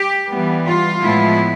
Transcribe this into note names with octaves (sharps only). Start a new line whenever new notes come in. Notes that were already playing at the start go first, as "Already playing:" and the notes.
Already playing: G4
E3 G3 B3
F4
A2 F3 G#3 B3 E4